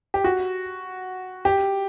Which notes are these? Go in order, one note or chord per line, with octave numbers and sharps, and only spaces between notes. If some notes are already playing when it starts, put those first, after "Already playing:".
G4
F#4
G4